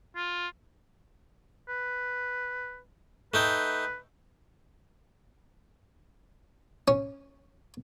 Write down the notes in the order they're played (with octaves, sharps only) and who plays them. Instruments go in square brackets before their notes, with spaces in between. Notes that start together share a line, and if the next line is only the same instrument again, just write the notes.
[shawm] F4
[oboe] B4
[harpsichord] A3 D#4 G5 [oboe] B4
[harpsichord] C#4